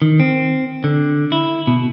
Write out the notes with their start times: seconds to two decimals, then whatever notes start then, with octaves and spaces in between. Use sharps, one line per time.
0.02 D#3
0.20 C4
0.84 D3
1.32 E4
1.67 B2